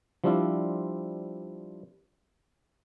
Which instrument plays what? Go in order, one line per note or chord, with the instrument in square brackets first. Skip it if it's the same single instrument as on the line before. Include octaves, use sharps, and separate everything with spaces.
[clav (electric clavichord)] F3 G3 C4 D4 E4 F4